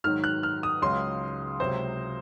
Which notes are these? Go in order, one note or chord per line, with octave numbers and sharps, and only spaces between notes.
G#2 D#3 F#3 F6
F#6
F6
D#6
C#2 C#3 F#3 C6
C#2 C3 F#3 C5